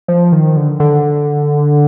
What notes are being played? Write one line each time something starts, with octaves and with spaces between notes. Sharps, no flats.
F3
D#3
D3
D3